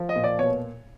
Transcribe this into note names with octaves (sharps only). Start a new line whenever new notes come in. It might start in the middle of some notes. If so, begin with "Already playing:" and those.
Already playing: F3
D#5
A#2
D5
B2 C#5